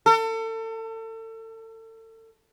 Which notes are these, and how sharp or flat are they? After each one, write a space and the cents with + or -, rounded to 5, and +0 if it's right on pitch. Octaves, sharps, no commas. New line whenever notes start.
A4 +35